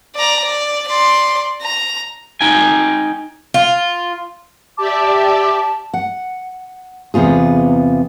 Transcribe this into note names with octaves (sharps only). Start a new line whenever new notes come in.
D5 A#5
D5
D5 C6
A#5
D#4 G5 G#5
F4
G4 D5 E5 A5 D6
F#5
E2 C3 B3 F4 G#4